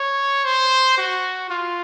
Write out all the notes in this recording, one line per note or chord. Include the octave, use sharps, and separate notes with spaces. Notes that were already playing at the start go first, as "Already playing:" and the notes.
Already playing: C#5
C5
F#4
F4